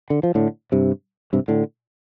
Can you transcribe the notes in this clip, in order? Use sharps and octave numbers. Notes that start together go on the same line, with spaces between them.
D3
F3
A2 D3
G2 C3
G2 C3
A2 D3